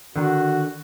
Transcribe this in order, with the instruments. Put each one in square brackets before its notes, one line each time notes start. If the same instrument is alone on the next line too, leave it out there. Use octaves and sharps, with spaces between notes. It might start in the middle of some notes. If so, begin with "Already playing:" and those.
[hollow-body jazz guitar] D3 D#3 [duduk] F#4